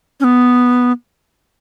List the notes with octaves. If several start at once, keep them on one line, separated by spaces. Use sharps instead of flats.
C#4
B3